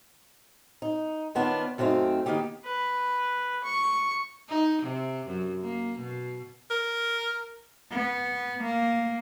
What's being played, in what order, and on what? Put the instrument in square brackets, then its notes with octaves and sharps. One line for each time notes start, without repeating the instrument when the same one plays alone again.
[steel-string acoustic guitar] D#4
D#3 B3 C#4 D4 F4
F#2 D#3 A3 C4 D#4 F5
D#3 A#3 B3 D#4 G4
[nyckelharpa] B4
C#6
[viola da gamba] D#4
C3
F#2
A#3
B2
[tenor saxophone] A#4
[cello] B3
A#3